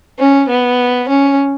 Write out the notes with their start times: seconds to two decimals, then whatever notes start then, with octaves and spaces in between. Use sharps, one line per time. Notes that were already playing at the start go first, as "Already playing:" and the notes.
0.19 C#4
0.49 B3
1.09 C#4